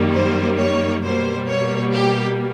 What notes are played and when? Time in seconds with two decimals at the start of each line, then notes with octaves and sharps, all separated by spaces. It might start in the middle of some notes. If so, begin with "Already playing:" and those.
Already playing: F#2 D#3 G3 A#3
0.14 C5
0.58 C#5
1.03 B2 G3 A#3 C5
1.48 C#5
1.93 G4